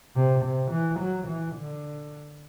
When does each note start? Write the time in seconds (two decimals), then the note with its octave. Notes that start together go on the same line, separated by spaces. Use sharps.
0.15 C3
0.44 C3
0.71 E3
0.99 F#3
1.27 E3
1.55 D3